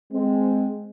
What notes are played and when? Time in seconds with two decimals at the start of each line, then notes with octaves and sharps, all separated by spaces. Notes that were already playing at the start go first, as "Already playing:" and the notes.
0.13 G#3 C4